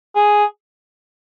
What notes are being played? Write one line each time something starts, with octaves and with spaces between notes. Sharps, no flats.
G#4